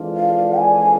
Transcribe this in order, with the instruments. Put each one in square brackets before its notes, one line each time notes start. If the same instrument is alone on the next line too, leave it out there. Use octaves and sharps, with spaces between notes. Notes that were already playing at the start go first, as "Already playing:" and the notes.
Already playing: [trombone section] F2 E3 G#3 D4 F4
[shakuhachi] F5
G#5